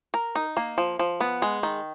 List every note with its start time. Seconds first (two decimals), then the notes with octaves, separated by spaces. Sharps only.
0.14 A#4
0.35 D#4
0.57 A#3
0.78 F3
0.99 F3
1.20 B3
1.42 G#3
1.63 D#3